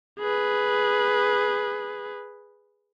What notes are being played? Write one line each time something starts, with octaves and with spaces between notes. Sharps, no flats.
G#4 B4